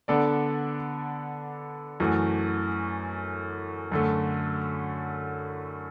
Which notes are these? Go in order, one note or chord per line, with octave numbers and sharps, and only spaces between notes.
D3 B3 D4 A4 D5
F#2 E3 A3 F#4
F#2 D3 A3